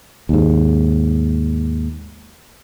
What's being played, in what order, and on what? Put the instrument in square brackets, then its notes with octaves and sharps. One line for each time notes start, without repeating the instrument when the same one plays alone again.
[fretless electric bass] D#2 G#2